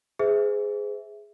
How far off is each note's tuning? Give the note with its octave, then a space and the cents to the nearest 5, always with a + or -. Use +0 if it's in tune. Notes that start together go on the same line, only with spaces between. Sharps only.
G#4 +0 C5 -35 E5 +0